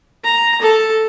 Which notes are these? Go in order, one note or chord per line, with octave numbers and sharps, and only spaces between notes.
A#5
A4